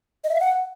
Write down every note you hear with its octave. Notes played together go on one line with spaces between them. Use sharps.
D#5
E5
F5
F#5